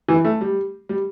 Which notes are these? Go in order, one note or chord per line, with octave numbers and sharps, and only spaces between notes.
E3
A3
G3
G3